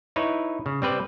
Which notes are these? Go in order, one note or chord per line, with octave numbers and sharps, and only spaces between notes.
D#4 E4 B4 C#5
C#3
G3 C4 B4 D5